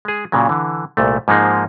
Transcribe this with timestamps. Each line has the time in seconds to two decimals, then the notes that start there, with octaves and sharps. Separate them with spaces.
0.05 G#3 G#4
0.32 A#2 C#3 F#3
0.49 D3 E3
0.97 C2 A#2 A3
1.28 G#2 F3 G#3 A#3 D#4 G#4